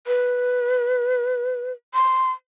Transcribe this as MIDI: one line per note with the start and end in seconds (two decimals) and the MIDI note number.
0.07 1.72 71
1.94 2.31 84